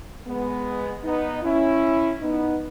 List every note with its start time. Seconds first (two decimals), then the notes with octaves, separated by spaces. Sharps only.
0.27 G#3 B3
1.04 B3 D#4
1.43 C#4 E4
2.20 B3 D#4